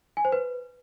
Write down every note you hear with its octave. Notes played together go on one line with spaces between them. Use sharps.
G#5
C5
B4